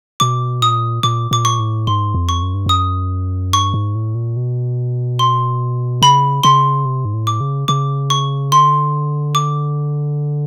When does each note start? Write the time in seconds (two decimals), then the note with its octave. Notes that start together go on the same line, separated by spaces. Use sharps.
0.20 B2 D6
0.62 A#2 D#6
1.03 A#2 D6
1.31 A#2 D6
1.45 C#6
1.59 A2
1.87 G#2 C6
2.14 F2
2.29 C#6
2.42 F#2
2.54 G2
2.66 F#2 D#6
3.53 G2 C#6
3.74 G#2
3.95 A2
4.15 A#2
4.37 B2
5.19 C6
6.02 C#3 B5
6.43 C#3 C6
6.85 C3
7.05 G#2
7.14 A2
7.27 D6
7.41 C#3
7.68 C#3 D6
8.10 C#6
8.52 D3 C6
9.35 D6